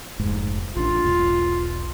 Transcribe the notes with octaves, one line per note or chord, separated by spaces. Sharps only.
F1 G#2
A1 D4 F4
E1 B1